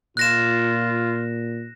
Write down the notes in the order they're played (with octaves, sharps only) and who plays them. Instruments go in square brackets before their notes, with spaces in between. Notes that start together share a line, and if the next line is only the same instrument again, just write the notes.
[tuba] A#2 [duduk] F4 [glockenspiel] F#6 A#6 E7